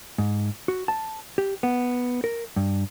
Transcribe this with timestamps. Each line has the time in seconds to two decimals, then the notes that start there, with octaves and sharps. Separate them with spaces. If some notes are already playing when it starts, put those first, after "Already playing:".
0.18 G#2
0.68 F#4
0.88 A5
1.38 G4
1.63 B3
2.24 A#4
2.56 G2